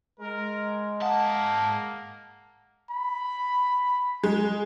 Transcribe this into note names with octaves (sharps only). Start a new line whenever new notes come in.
G#3 A#4
G#2 A#3 F5 F#5 A5 D#6
B5
G#3